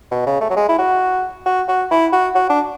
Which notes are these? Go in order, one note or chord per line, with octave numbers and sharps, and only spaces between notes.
B2
C#3
A3
F#3
G#3
E4
F#4
F#4
F#4
E4
F#4
F#4
D4